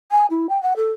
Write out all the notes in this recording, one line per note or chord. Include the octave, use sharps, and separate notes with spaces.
G#5
E4
G5
F#5
A4